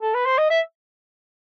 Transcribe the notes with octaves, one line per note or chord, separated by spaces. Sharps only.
A4
B4
C5
D#5
E5